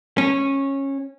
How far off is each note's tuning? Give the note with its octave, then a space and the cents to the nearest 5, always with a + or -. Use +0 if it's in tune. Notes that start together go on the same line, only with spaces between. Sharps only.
C#4 -15